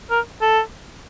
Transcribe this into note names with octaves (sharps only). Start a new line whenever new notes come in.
A#4
A4